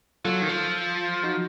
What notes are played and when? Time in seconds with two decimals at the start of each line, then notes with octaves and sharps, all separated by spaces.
0.24 F#3 F4 A4
0.42 D#3
0.49 F3
1.23 D#4 F#4